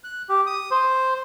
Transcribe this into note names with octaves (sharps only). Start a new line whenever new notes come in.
F#6
G4
D#6
C5